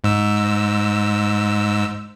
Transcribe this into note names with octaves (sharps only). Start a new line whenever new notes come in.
G#2 E6